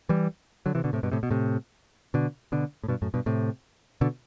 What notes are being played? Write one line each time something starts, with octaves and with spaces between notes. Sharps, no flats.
E3 G3
D3 F#3
C3 E3
B2 D3
A2 C3
G2 B2
A2 C3
B2
A2 C3
B2 D3
B2 D3
A2
G2 B2
F#2 A2
G2 B2
A2 C3
B2 D3